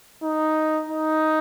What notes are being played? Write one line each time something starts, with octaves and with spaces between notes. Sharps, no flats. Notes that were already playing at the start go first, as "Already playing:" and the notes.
D#4
D#4